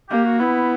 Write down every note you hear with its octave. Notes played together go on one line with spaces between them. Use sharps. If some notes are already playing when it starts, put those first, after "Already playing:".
A#3 G4
F#4
B3 E4